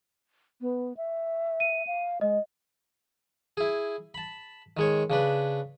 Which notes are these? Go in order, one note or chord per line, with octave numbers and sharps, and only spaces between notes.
B3
E5
D#7
F5
G#3 D#5
E4 G#4
A5 B5
D#3 G#3 C#5
C#3 D4 B4